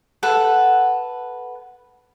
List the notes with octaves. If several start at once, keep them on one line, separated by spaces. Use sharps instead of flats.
A4 B4 F#5